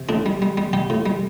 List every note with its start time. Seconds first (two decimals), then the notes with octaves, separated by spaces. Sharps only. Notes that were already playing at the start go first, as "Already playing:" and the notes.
Already playing: C3
0.09 A2 D4
0.26 G3
0.42 G3
0.57 G3
0.73 G3 G4
0.90 A2
1.06 G3